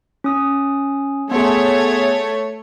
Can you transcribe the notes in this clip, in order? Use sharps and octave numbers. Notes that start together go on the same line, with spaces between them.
C#4 D#6
A3 B3 G#4 C#5